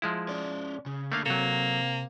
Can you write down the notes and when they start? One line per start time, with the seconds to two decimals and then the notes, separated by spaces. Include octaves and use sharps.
0.02 F3 G#3 E4
0.29 C#4 D5
0.86 C#3
1.12 D3 A3 A#3 F5
1.26 C3 F#3 A#3 A4